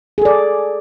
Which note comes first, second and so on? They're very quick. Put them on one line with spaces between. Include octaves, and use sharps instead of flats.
G#4 A4 D5